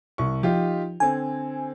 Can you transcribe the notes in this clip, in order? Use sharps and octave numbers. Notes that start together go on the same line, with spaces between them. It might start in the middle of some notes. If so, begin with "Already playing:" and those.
C2 C#6
F3 D#4 F4 G4
D3 C4 G#5